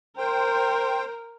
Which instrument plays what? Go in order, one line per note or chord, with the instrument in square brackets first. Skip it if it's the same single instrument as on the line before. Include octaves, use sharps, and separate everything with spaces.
[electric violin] A#4 [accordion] C5 G5